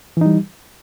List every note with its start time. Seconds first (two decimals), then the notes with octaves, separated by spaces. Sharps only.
0.17 E3
0.21 D#4
0.26 G3